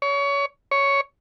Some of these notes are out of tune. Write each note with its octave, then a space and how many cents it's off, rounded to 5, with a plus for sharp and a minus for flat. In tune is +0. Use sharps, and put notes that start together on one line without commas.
C#5 +25
C#5 +5